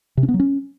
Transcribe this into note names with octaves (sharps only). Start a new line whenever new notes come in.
C3
C#4
B3
F#3
C#4